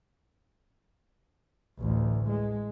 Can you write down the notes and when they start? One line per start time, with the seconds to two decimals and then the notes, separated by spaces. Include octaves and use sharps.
1.79 A1 D2
2.28 G#3